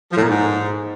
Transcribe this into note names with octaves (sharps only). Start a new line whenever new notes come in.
F3
A2
A#2
G#2